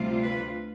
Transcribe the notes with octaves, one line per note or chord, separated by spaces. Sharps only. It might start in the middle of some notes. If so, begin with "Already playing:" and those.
Already playing: D2 C3 G3 C4 F4
B4